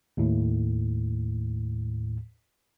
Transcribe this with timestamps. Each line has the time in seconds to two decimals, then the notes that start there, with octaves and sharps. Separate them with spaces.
0.17 D#2 A2